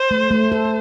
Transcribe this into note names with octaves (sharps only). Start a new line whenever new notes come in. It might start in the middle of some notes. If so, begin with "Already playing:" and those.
Already playing: C5
A3
A3
A4